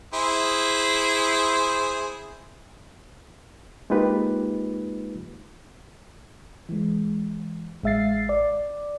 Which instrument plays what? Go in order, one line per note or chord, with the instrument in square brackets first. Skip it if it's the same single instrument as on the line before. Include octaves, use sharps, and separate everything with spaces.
[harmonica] E4 G#4 C5
[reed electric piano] G#3 A#3 D#4 F4 G4 B4
[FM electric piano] E3 G#3
A1 G#3 E5 F5 A6 C7
D5